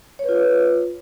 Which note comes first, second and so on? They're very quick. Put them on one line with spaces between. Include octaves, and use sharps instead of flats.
C#5 B4 F4